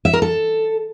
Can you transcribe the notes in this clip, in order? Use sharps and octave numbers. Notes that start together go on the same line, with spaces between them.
E5
A#4
A4